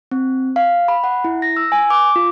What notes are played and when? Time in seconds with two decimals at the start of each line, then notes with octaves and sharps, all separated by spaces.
0.11 C4
0.56 F5
0.88 B5
1.04 F#5
1.24 E4
1.42 A#6
1.57 E6
1.72 G#5
1.90 D6
2.16 F4